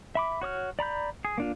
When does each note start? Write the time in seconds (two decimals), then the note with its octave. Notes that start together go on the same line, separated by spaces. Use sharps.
0.15 E5 B5 D6
0.41 F#4 C#5 D#6 F6
0.79 D5 A#5 B5 G6
1.25 G#4
1.38 A#3 D4 F4